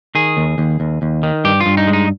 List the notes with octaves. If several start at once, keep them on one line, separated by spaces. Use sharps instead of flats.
D#3 G#4
D#2
D#2
D#2
D#2
D#3
G2 G4
F4
G2
D#4
G#3
D#4